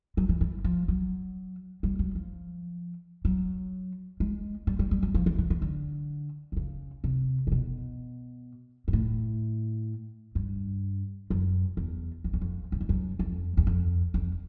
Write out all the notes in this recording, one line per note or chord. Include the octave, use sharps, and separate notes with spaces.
F#3
E3
E3
F3
F#3
G3
F#3
F3
F#3
G#3
G3
G3
G3
F#3
F3
E3
E3
E3
D3
C3
C#3
C3
C3
B2
G#2
A2
G2
F#2
E2
F2
E2
F2
F#2
F2
F#2
F2
E2
F2
F2